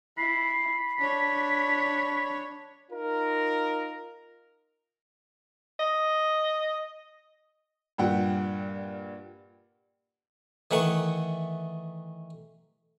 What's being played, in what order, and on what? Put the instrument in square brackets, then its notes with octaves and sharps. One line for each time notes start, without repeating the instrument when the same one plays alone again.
[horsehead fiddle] E4 [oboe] B5 [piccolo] C7
[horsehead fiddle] D4 C#5 [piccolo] B6
[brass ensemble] D#4 F4 A#4
[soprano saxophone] D#5
[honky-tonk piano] G2 A#2 G4 F#5 G5
[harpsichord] D#3 E3 A3 F#5 C#6